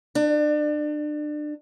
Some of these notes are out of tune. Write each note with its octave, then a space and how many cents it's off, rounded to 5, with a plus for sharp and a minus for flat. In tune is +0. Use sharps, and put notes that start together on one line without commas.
D4 +30